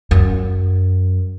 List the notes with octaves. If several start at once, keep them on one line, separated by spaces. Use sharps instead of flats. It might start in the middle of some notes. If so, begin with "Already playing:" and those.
F#2